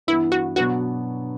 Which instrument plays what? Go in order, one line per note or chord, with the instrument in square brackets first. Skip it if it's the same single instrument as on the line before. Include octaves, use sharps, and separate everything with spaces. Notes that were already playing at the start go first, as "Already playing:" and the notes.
[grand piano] G2 E3 B3 [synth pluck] E4
[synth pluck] F#4
[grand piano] B2 F#3 B3 D4 [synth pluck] F#4